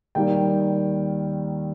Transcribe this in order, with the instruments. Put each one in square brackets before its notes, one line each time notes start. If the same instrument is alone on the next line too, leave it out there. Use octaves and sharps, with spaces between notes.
[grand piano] D#2 D#3 G3 G5